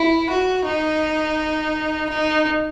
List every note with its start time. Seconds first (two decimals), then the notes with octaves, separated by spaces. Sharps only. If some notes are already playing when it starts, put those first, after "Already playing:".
Already playing: E4
0.30 F#4
0.65 D#4
2.09 D#4